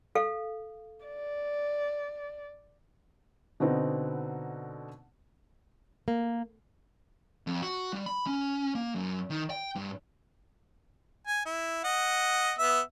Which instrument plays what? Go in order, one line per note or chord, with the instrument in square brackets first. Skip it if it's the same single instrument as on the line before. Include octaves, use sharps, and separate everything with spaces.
[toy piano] A4 F5
[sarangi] D5
[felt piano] B2 D3 B3 C4 D#4
[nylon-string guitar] A#3
[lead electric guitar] F2
F#4
G3
B5
C#4
A#3
F#2
D#3
G5
G2
[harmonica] G#5
E4
D#5 F#5
B3 E5